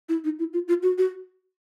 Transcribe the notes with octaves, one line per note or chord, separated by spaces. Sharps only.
E4
D#4
E4
F4
F4
F#4
F#4